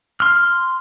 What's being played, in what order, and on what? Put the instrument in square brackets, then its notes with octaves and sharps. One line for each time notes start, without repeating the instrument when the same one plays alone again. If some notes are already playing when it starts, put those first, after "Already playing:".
[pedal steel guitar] C6 F6